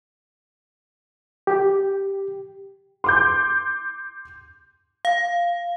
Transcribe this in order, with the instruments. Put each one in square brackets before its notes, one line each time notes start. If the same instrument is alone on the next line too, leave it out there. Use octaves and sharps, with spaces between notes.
[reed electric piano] G4
[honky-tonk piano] C6 D6 G6
[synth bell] F5